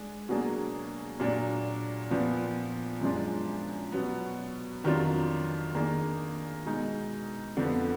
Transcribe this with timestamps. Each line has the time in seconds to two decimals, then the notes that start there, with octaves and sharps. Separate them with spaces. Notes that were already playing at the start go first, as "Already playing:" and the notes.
Already playing: G#3 D4 G#4
0.29 B2 F#3 A#3 D4 G#4
1.20 A#2 F#3 A#3 D4
2.11 A#2 F3 B3
3.01 F#2 F3 G#3 D4 F4
3.92 B2 F#3 B3
4.84 F2 D#3 F#3 D4 F4
5.75 D#3 A#3 D4 G#4
6.66 B2 G#3 D#4
7.57 F2 D3 F3 B3